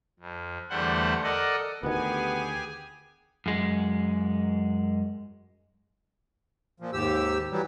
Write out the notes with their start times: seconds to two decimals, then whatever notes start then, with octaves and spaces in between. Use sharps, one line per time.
0.20 F2
0.70 E2 D3 G3 A3 C5 F#5
1.23 A4 A#4 D5 D#5 F#5
1.83 D2 D#3 B3 G4 G#4 G#5
3.46 F#2 G#3
6.80 A#2 F3
6.93 D#2 G#2 G4 E6
7.51 E3 F#3 G3